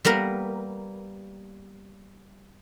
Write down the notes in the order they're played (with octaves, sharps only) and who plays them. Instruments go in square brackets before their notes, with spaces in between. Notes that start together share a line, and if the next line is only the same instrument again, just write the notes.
[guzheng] G3 A#3 B3 A#4